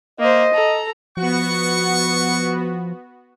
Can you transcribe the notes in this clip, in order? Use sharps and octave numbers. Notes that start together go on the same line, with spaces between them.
A#3 C5 D#5
A4 A#5
F3 B3 F#4 F#5 C#6